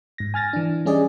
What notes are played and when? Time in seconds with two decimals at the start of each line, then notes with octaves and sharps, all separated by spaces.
0.18 G#2 A#6
0.34 G#5 F6 A6 A#6
0.53 E3 D4
0.85 G3 C#4 G#4 D5 D#5